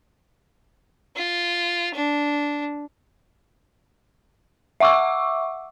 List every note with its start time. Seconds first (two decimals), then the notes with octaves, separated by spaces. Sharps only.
1.16 F4
1.94 D4
4.80 E5 F#5 C#6 D6 E6